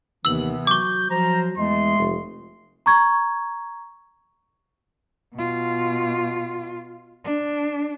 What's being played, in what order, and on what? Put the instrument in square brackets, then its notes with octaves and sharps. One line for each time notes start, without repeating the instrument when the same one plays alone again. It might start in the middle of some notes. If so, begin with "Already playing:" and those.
[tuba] D#2 [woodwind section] C3 E3 B3 [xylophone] E6 F#7
[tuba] F#3 [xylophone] C#6 D6 [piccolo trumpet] G6
[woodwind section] F3 C5 [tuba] F#3 [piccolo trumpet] A#5
[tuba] E2 [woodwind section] G#3 A3 [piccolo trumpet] C6
[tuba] F1
[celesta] A#5 C#6 G#6
[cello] B2 F4
D4